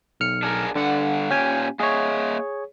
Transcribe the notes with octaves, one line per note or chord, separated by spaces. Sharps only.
B1 F6 C#7
D4 G#4 A#4
G2 D3 F#5
A#2 C#4 G4 G#5
A#3 G#4 C#5 D#5 E5